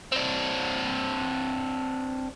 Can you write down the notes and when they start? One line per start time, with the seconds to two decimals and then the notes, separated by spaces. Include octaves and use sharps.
0.12 C4 D4